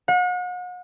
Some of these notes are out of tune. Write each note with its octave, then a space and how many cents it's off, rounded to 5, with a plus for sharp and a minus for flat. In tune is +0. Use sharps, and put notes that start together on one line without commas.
F#5 -40